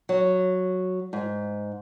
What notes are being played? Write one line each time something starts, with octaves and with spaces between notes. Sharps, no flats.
F#3
G#2